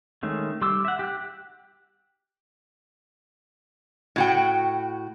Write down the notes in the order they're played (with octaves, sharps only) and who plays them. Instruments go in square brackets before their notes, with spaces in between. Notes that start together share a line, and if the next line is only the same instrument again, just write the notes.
[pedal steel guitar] D#3 G#3 A3 C#4
G3 C6 D6 E6
E5 F#5
G4 F#6
[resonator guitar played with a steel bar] A2 F#4 G5